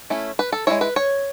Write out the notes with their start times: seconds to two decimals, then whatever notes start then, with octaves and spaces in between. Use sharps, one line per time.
0.10 A3 C#4 E4
0.39 B4
0.52 A4
0.67 G#3 C#4 E4 C#5
0.81 B4
0.96 C#5